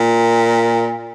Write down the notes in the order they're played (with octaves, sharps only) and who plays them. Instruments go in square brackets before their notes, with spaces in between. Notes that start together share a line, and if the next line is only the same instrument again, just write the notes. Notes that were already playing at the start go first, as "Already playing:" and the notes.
Already playing: [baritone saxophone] A#2